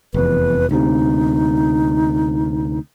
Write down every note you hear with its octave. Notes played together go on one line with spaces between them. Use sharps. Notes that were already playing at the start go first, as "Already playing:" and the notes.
F1 E2 B4
D2 C3 D#4